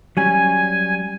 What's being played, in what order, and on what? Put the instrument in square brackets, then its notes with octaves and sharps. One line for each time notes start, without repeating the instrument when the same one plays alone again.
[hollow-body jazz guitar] F#3 G3 C#4 [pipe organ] G#5